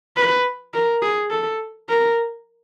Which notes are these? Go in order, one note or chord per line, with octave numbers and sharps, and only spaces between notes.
B4
A#4
G#4
A4
A#4